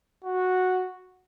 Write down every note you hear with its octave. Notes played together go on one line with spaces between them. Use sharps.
F#4